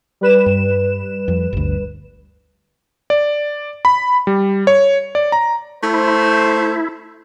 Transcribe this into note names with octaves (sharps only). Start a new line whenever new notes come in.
G3 B4 E7
G2
F2
G1 D2
D5
B5
G3
C#5
D5
A#5
A3 E4 C5